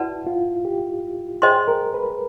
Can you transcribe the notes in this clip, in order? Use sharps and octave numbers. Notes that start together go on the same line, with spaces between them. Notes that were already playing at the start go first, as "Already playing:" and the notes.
Already playing: E4 F#4 B4 D5 F#5 A5
F4
G4
G#4 C5 D#5 G5 C6
A#4
B4